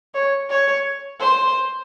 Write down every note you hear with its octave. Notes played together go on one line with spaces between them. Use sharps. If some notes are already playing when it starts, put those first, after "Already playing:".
C#5
C#5
C5